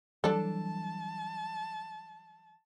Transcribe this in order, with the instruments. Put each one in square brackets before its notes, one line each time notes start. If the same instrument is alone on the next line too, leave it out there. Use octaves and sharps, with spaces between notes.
[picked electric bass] E3 F#3 G3 [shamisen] D4 A4 [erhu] A5